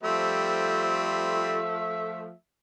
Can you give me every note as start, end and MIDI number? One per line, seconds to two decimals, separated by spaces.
0.03 2.29 53
0.03 1.59 55
0.03 2.29 57
0.03 1.59 60
0.03 2.36 76